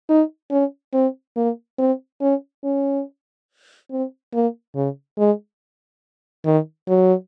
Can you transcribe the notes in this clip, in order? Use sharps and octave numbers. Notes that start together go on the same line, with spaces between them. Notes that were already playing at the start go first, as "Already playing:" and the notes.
D#4
C#4
C4
A#3
C4
C#4
C#4
C4
A#3
C#3
G#3
D#3
F#3